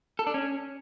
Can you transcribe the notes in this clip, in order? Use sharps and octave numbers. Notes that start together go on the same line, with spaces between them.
A4
D4
C#4